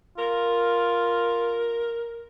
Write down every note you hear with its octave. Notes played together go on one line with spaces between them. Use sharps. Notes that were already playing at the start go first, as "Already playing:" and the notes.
F4 A#4